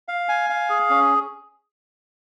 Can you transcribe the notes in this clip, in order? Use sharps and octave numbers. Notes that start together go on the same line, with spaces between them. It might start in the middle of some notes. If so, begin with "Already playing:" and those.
F5
G#5
F5
G#4
C#4